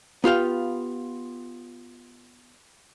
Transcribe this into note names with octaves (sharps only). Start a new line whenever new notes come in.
B3 F4 G4 F5